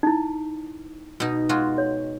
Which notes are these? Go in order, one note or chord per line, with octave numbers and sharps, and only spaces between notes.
D#4 E4
B2 D#4
G#3 F4 F#4
C#5